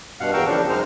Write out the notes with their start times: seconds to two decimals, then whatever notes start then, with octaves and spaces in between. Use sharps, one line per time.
0.20 G2 B2 F5 F#5
0.33 E2 A#4 F5 G5 C#6 E6
0.46 C#3 F3 D4
0.69 F#2 G#3 D#4 C5 F6